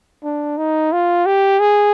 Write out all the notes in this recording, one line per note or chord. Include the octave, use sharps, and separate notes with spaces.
D4
D#4
F4
G4
G#4